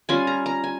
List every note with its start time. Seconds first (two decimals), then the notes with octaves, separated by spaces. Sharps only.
0.09 G3 C#4 F4 G#5
0.27 A#5
0.46 A#5
0.64 G#5